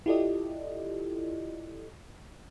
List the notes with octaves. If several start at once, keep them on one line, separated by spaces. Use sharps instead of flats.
E4 F4 G4 A4 D5 D#5